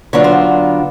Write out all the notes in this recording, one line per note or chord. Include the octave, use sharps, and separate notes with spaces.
D3 F#3 B3 D4 F4 C#5
C5